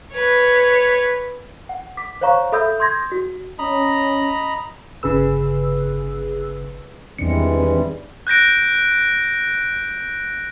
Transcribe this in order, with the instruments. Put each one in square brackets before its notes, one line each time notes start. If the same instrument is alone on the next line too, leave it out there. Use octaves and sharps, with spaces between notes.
[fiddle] B4 C#5
[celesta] F#5
D6 B6
C5 C#5 F5 A#5 C#6
A4 E5 B5 D#6 E6 G6
C6 D#6 G6 G#6 A#6
F#4
[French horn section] C#4 [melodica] D#5 A#5 B5
[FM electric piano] G1 C#3 G#4 B4 E6
[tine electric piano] E2 C#7 [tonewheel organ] D#3 C4 D4 [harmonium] E3 G3 G#3
[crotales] F#6 G6 A#6 D7